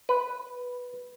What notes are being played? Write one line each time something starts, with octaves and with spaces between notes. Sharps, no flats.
B4